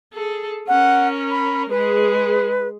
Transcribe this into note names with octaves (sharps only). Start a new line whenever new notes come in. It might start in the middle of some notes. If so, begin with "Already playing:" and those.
G#4 A4
C#4 A#4 F#5
B5
G#3 G#4 B4